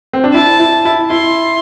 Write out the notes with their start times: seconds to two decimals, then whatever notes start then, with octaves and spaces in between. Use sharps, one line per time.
0.13 C4
0.24 D4
0.34 E4 A5
0.60 E4
0.85 E4
1.10 E4 C6